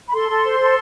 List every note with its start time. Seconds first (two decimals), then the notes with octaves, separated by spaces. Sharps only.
0.10 B5
0.14 A4 C6
0.29 A4
0.44 C5
0.59 A4